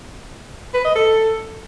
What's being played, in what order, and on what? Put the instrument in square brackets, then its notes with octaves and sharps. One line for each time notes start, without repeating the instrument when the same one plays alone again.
[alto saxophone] B4
D#5
A4